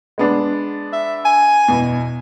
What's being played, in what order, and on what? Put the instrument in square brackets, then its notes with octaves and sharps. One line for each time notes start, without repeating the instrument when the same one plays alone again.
[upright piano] G#3 B3 D4
[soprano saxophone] E5
G#5
[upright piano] E2 B2